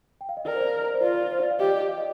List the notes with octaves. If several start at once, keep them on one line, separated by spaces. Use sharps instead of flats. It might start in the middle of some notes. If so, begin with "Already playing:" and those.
G5
F5
D#5
A#4 D5
C5
D5
C5
F4 D5
D5
C5
D5
F5
G4 D#5
D5
D#5
F5
D#5